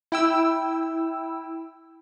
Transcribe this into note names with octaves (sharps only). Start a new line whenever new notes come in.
E4 G5 E6